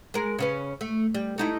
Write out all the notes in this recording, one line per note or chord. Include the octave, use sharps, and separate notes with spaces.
G#3 A#4
C#3 C#4 B4
A3
G3
A3 D#4 E4